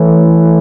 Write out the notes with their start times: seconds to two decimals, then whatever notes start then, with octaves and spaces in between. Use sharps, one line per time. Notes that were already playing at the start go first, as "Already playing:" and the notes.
Already playing: E3 A3 E4 A4 C#5 E5